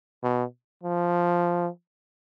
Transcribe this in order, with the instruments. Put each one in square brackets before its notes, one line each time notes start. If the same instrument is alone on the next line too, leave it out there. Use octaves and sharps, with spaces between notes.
[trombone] B2
F3